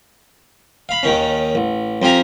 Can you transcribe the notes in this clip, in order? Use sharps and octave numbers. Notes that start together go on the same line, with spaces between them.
F5 B5
D#2 D#3 C#4
A1
F2 G4 F5 G#5 A#5